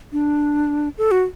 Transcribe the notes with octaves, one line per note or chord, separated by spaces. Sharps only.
D4
A4
F#4